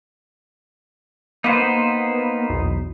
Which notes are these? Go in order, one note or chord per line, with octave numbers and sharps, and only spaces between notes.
A#3 B3 D#4 B4 C5
B1 E2